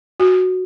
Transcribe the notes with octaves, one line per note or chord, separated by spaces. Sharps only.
F#4